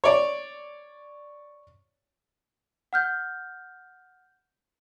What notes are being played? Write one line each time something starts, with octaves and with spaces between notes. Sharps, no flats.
C#5 D5
F#5 F6 G6